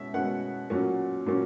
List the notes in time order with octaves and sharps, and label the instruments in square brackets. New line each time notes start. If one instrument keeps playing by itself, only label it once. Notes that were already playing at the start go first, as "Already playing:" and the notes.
Already playing: [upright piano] B2 G#3 C#4 E5
B2 G#3 C#4 F#5
A#2 F#3 C#4
A#2 F#3 C#4